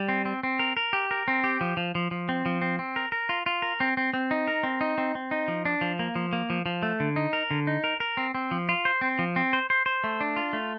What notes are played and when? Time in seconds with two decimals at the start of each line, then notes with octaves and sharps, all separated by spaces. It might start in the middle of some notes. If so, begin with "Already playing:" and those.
Already playing: G3
0.09 C4
0.25 C4
0.43 C4
0.59 A#4
0.77 A#4
0.93 G4
1.11 A#4
1.28 C4
1.44 G4
1.61 F3
1.77 F3
1.95 F3
2.11 F3
2.29 C4
2.46 F3
2.61 C4
2.79 C4
2.96 A#4
3.12 A#4
3.29 F4
3.46 F4
3.62 A#4
3.80 C4
3.97 C4
4.14 C4
4.31 D#4
4.48 A#4
4.63 C4
4.81 D#4
4.98 C4
5.15 C4
5.31 D#4
5.48 F3
5.65 D4
5.81 F3
5.99 A#3
6.15 F3
6.33 A#3
6.50 F3
6.66 F3
6.83 A3
7.00 D3
7.16 D#4
7.33 A#4
7.51 D3
7.67 D#4
7.84 A#4
8.00 A#4
8.17 C4
8.35 C4
8.51 F3
8.69 F4
8.85 C5
9.01 C4
9.19 F3
9.36 C4
9.53 C5
9.70 C5
9.86 C5
10.04 A3
10.21 D4
10.36 F4
10.53 A3